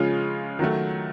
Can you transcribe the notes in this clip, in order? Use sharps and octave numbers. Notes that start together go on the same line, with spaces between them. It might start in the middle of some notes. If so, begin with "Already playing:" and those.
Already playing: C#3 F3 G#3 C#4 F4
D#3 F#3 A3